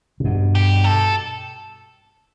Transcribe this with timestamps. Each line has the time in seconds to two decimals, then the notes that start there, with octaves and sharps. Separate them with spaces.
0.20 C#3
0.24 G2 B2
0.55 G4
0.84 A4